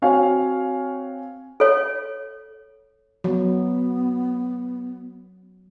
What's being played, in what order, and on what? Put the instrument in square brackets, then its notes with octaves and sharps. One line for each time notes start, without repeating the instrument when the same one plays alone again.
[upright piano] C4 F#4 C#5 F5 G#5
[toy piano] A4 C#5
[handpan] F#3 [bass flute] B3